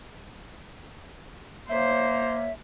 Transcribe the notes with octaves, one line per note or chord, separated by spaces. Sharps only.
A#3 C5 C#5 E5